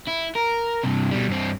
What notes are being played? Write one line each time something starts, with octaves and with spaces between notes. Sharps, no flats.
E4
A#4
G2 C3
B2 G3
G2 C4